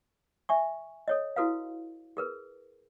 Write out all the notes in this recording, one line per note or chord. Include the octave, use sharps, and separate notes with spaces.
E5 G#5 C#6
A4 C#5 D#5
E4 F#4 A4 B4 F5
G#4 A#4 B4